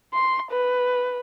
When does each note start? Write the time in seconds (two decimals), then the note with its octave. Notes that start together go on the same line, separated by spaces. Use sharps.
0.14 C6
0.51 B4